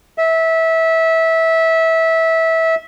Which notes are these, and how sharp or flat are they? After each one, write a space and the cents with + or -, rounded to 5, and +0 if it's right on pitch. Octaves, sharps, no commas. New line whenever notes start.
E5 -20